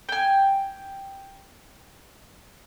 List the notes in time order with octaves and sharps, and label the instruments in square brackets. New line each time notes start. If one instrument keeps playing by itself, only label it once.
[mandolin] G5 G#5